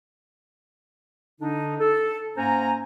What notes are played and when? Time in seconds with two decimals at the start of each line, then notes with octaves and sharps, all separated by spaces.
1.40 D3 D4 D#4
1.79 A4
2.36 G#2 A#3 C#4 C5 G#5 A#5